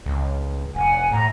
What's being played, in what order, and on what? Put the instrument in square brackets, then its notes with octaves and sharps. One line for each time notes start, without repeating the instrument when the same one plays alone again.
[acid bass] C#2
[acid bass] F1 [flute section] F#5 G#5
[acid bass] A2 [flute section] A#5